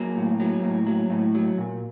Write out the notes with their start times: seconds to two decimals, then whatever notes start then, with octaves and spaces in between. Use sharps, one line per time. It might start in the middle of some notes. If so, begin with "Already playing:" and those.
Already playing: F#3 A#3
0.16 A2
0.40 F#3
0.63 A2
0.87 F#3
1.10 A2
1.35 F#3
1.58 A#2